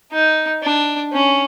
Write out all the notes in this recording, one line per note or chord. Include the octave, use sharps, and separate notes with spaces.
D#4
D4
C#4